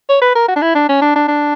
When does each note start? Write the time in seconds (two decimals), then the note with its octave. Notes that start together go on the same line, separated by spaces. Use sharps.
0.09 C#5
0.22 B4
0.35 A#4
0.48 F#4
0.56 D4
0.62 E4
0.75 D4
0.89 C#4
1.02 D4
1.15 D4
1.28 D4